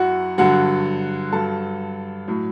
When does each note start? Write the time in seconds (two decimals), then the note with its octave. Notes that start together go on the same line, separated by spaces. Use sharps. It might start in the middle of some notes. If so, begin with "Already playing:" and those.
Already playing: F#2 F#3 E4 F#4 F#5
0.38 G2 D3 F#3 F#4 F#5
1.32 G2 F#3 A4 A5
2.27 A2 F#3